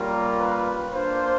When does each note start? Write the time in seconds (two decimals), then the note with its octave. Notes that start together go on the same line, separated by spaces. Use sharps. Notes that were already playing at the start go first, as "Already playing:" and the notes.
Already playing: G3 A#3 C#4 F4 A#4
0.40 B4
0.94 A#3 D4 F4 C5